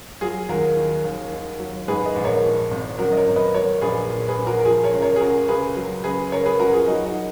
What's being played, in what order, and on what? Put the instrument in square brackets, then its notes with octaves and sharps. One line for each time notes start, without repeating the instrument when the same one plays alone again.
[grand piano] F#3 F4 G#4
D#2 F#4 A#4
D#3
D#2
D#3
F#3
G#2 G#4 B4
B4 D#5
A#1
A#4 C#5
F3
G#1
F#2 F#4 A#4
D#5
A#4 C#5
G#1
B4 D#5
F#3 A#4 C#5
A#1 G#4 B4
A#2
G#4 B4
A#1
F#4 A#4
A#4
F3 F4 G#4
A#4 C#5
C#2
A#4 C#5
G#4
C#3 F#4 A#4
C#2 G#4 B4
F#3
C#2 G#4 B4
C#3 A#4 C#5
G#4 B4
C#2 F#4 A#4
F4 G#4
F#3 D#4 F#4
D#4 F#4